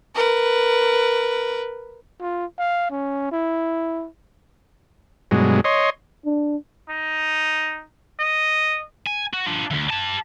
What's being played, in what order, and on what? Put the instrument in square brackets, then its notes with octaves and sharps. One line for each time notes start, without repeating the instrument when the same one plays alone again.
[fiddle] A#4 B4
[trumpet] F4
F5
C#4
E4
[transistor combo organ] G2 B2 F#3 G#3
C#5 D#5 C6
[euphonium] D4
[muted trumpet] D#4
D#5
[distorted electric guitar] G#5
F#4
D4 F4
D2 E3
G4 A5